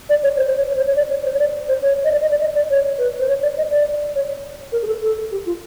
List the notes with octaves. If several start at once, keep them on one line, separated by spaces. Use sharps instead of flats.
D5
C#5
C5
C5
C#5
C#5
C5
C#5
D5
C#5
C5
C#5
D5
C5
C#5
D#5
D5
D#5
D5
D#5
D5
C#5
B4
C5
C#5
D5
D#5
D5
C#5
A#4
G#4
A4
A4
G4
F4